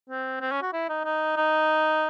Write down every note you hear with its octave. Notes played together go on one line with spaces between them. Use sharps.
C4
C4
C#4
F#4
E4
D#4
D#4
D#4